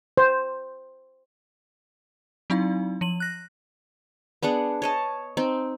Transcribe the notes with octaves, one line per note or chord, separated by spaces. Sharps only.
C5
F#3 C4 D#4 E4 F5
F3 D#7 F#7
F#6 A#6
B3 D4 G#4 F#5
C#5 D#5 A5
C4 D#4